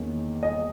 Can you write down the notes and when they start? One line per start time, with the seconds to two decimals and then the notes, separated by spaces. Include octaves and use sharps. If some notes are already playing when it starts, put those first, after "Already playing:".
Already playing: E2 D#3 A#3 C#4
0.43 D#5